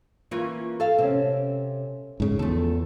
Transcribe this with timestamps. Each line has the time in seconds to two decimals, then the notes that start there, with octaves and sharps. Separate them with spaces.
0.31 E3 A#3 C#4 F4
0.80 A4 F5
0.98 C3 C4 C#4
2.20 G#2 C#3
2.39 E2 F3 A3 A4